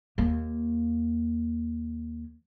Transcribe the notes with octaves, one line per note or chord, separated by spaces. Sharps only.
D#2 A#3